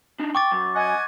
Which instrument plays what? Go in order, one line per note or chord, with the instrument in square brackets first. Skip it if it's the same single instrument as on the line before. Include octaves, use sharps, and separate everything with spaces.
[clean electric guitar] D4 D#4
[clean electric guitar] G5 [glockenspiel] C#6 D6 A6
[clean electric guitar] F#2
[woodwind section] D#5 F#5 G#5